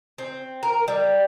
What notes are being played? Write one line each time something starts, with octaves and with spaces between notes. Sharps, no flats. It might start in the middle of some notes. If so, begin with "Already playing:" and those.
C4
A#4
G3